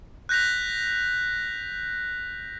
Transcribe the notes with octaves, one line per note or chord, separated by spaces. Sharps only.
F#6 G6 A#6 B6 F7